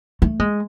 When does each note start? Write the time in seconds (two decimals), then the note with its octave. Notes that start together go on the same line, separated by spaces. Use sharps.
0.22 A3
0.39 G#3